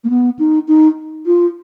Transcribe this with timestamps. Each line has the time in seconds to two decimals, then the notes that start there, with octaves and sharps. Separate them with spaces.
0.04 A#3
0.10 B3
0.39 D#4
0.68 D#4
1.26 F4